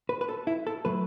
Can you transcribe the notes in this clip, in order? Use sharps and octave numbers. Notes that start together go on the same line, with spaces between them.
B4
B4
A4
E4
A4
F#3 A3 B4